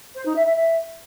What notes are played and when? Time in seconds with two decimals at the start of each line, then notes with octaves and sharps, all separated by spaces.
0.15 C5
0.26 D#4
0.36 E5
0.46 E5
0.56 E5